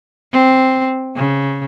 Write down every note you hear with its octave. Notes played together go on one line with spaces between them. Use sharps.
C4
C#3